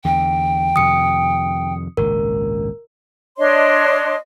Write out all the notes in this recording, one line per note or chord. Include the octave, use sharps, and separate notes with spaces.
E2 D3 G5
F2 C3 D#3 D#6 C#7
G#1 C#2 A#2 A#4
D4 C#5 D#5 C6